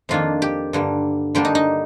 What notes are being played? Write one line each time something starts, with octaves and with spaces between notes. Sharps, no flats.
F2 D#3 A#3 D4 F4
G4
G2 D3 G3 A#3
D3 G3 A#3 D4 G4
D#4
D#4